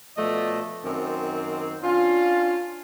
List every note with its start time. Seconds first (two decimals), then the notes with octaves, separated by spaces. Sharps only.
0.17 B2 F3 A3 D5 D#5
0.85 F#2 D#3 C4
1.84 C#4 D4 F4